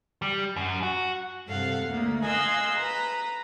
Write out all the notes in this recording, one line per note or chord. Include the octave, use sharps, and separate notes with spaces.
G3
F#2
F#4
G2 C3 A4 F5 F#5
D2 A3 A#3
D#5 F5 F#5 G#5 C6 E6
B4 A#5